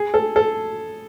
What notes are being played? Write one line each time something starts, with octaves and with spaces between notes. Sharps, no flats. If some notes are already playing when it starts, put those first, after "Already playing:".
Already playing: G#4
A4
A4